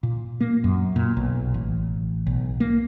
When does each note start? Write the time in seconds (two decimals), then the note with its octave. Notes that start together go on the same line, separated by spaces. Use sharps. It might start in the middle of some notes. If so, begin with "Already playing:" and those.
0.03 A#2
0.40 A#3
0.64 F#2
0.96 A#2
1.17 B1
1.54 A1
2.26 B1
2.60 A#3